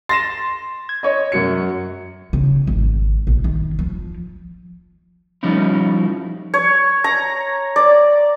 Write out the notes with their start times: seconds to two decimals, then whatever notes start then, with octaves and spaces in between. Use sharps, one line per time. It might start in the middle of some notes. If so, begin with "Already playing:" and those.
0.09 C6 A6 A#6 E7
0.89 G#6
1.03 C#5 D#5
1.32 F#2 F#4 C#7
2.33 C#3
2.67 G#1
3.27 A#1
3.44 D#3
3.79 F3
5.43 F3 G3 C#4 D#4 E4
6.54 C#5
7.04 A#5
7.76 D5